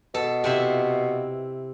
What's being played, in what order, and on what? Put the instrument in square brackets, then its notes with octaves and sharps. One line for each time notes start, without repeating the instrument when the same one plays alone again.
[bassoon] B2 [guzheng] A4
[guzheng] C3 C4 E4